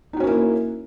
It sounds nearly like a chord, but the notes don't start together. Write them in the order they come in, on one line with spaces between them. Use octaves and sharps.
D#4 F#4 C#4 A#3 E4